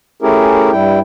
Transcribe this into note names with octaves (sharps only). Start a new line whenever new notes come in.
A3 C#4 E4 G4 G#4 A#4
G2 G3 E4 G5